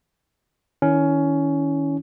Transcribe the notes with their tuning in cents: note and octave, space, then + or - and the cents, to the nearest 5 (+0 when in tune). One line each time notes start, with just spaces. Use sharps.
D#3 +15 C#4 +15 E4 -20